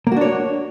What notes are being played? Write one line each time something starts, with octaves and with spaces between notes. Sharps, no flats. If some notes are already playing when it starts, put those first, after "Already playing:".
A#3 D4 F#4 C#5